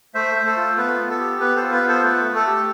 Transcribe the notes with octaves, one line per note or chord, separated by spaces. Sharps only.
A3 C5 E5
A3
A4 C5
F4
B3 B4
B3
A4
G4
B3 B4
A4 C5
F4
B4
B3
A4 C5
A3 B4
A3
A4
G4